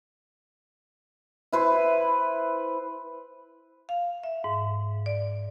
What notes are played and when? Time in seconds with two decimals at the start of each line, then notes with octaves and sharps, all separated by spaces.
1.52 E4 B4 C5
3.89 F5
4.23 E5
4.44 G#2
5.06 D5